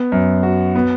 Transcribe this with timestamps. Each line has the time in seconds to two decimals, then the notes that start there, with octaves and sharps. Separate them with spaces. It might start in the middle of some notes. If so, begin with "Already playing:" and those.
Already playing: B3
0.12 F#2
0.43 F#4
0.75 B3